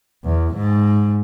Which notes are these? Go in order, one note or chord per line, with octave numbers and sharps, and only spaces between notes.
E2
G#2